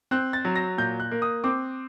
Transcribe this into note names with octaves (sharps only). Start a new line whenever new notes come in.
C4 F#6
A6
F#3
A#6
A#2 G6
F#6
A#3
D#6
C4 D6